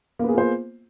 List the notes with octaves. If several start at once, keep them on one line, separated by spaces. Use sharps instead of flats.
A#3 B3 F4 G#4 C5